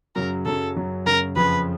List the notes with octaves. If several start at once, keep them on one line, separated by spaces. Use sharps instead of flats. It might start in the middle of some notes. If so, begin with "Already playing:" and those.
F#2 C#3 F#3 A#4
F#2 C#3 F#3 A4
F#2 C#3 F#3
F#2 C#3 F#3 A#4
F2 C#3 F3 B4